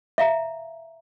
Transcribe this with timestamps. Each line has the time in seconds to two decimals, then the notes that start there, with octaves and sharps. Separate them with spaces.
0.18 E5 F5 A#5